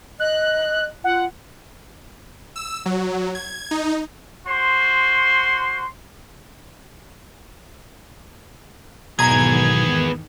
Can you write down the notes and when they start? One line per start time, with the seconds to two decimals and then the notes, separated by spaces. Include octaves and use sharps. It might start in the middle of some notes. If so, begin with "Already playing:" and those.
0.20 D#5 F#6
1.04 F4 F#5
2.56 E6
2.86 F#3
3.35 G#6
3.71 D#4
4.47 F#4 C5 C6
9.19 B1 E2 G#2 D#3 B3 G#4 A#5 G#6